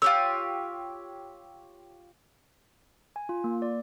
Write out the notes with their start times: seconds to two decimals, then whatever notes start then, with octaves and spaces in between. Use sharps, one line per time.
0.02 F4 G4 C#5 E6
3.16 G#5
3.29 F4
3.44 A#3
3.62 D5